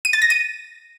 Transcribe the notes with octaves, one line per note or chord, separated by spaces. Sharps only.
D#7
A6
A#6
D#7